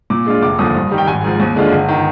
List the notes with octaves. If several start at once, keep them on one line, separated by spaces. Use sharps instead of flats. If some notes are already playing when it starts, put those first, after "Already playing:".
A#2 D6
G#3 D4 F4
F1 D6
D#2 D3 F3 D#6
G2
D#3 G3
G5
G#1 G#5
G#2 F3
D#2
D3 G#3 D4 F4
G1
D#3